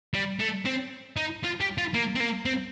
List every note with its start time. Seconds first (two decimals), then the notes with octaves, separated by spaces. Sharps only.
0.14 G3
0.40 A3
0.66 C4
1.17 D#4
1.43 F4
1.60 G4
1.78 F4
1.94 A#3
2.16 C4
2.20 A#3
2.46 C4